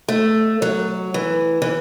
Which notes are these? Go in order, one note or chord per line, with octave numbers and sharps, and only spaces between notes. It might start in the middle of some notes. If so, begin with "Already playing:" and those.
A3
F#3
E3
E3